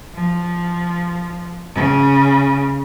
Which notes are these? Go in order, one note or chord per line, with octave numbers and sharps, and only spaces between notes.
F3
C#3